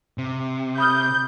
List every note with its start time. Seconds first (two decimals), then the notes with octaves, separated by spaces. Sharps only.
0.18 C3
0.78 B5 D#6 F6 G6